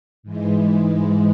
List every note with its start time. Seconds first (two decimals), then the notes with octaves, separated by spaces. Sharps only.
0.23 G#2 E3 G#3